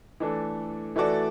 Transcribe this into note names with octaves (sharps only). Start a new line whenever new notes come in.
E3 A3 D4 A4
E3 A3 F#4 A4 D5